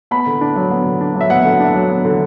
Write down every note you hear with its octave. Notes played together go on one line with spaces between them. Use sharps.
B3 B5
D3
D4
F#3
B3
D3
D4
F#3
E5
B3 F#5
D3
D4
F#3
B3
D3